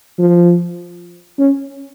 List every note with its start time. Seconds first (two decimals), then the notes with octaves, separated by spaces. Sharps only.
0.19 F3
1.39 C#4